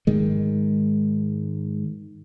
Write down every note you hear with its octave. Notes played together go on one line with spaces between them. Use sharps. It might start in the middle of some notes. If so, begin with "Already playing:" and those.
G#2 D#3 G#3